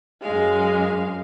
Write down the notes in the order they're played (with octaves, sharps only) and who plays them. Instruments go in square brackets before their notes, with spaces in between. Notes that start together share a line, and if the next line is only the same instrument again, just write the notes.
[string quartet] F#2 F5 [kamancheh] G#3